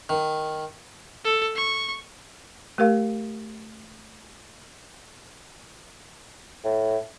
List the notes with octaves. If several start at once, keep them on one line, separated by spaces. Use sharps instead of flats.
D#3
A4
C#6
A3 G4 A#4 F5
A2